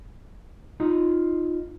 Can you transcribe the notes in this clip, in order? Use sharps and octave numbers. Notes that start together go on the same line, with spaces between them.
D#4 F4 D#5